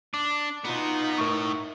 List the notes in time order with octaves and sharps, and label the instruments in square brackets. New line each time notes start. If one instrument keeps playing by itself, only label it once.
[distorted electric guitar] D4 [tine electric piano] D6
[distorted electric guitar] B2 B3 [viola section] D#4 F4
[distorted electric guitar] A2 [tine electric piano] A#4 C#6